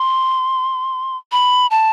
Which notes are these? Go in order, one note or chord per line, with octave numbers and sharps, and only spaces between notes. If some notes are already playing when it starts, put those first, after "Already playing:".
Already playing: C6
B5
A5